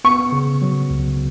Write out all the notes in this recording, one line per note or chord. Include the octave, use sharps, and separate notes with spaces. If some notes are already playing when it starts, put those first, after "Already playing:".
B3 C#6
C#3
F#3
C#2